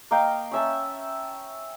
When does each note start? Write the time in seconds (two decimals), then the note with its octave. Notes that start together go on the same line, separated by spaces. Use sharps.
0.11 A#3 D#5 F5 G5
0.51 C#4 E5 A5